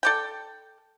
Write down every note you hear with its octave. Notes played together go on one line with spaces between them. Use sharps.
A4 D5 G5